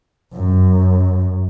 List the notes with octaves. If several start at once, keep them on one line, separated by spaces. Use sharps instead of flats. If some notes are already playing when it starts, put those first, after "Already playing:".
F#2